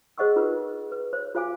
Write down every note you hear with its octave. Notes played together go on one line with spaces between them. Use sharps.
G#4 C5 D#5 F#5 C#6 E6
D#4 F4 A#4 B4
B4
C5 C#5
F4 C5 F5 G#5 D6